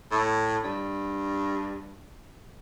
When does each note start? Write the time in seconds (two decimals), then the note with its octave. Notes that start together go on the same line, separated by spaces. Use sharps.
0.11 A2
0.64 G2